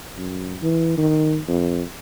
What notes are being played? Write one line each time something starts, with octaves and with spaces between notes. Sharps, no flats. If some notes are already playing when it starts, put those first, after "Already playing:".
F#2
E3
D#3
F2